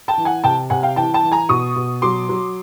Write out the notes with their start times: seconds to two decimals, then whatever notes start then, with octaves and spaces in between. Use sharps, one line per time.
0.08 G5 A5
0.17 E3
0.25 F#5 G#5
0.44 C3 G5 A5
0.70 C3 F#5 G#5
0.83 F5 G5
0.96 E3 G5 A5
1.14 G5 A5
1.23 E3
1.32 G#5 A#5
1.49 B2 C#6 D#6
1.76 B2
2.02 F#3 C6 D6
2.29 F#3